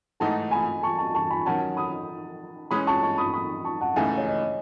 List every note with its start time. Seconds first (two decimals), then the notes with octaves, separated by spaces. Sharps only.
0.20 G#2 E3 A3 D#4 F#5 A5
0.51 G#5 B5
0.83 A5 C#6
0.98 A5 C#6
1.15 A5 C#6
1.30 G#5 B5
1.46 D#3 F#3 C#4 F#5 A5
1.77 B5 D#6
2.71 E3 G#3 C#4 B5 D#6
2.87 A5 C#6
3.02 A5 C#6
3.18 B5 D#6
3.34 B5 D#6
3.64 A5 C#6
3.81 F#5 A5
3.96 C#2 C#3 E3 A3 D#4 E5 G#5
4.17 C#5
4.27 D#5